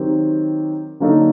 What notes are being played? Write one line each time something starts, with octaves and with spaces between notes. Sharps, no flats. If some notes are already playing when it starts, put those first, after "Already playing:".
Already playing: D#3 F#3 C4 G4 A#4
D3 F#3 A#3 D#4 A4